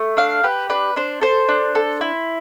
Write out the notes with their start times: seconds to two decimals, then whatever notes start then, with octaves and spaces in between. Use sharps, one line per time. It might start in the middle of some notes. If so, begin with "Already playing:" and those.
Already playing: A3
0.17 D4 F5
0.43 G4 B4
0.69 D4 B4
0.96 D4 C5
1.21 A4 C5
1.48 D4
1.75 A4
2.01 E4